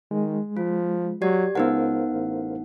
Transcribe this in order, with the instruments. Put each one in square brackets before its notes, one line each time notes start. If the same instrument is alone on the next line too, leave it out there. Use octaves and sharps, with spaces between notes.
[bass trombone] D#3 [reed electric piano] G#3
[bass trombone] F3 [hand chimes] F4
[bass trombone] F#3 [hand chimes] G4 D5 G#6
[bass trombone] C#2 [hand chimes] B3 D#4 F#5 [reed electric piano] A#4 C5 F5
[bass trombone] A1